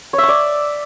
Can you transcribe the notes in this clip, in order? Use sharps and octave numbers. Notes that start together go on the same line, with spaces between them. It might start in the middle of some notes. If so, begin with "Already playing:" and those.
C#5
E5
C#6
D5